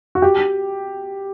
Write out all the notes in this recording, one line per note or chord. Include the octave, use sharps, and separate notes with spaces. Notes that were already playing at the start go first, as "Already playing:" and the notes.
F#4
G4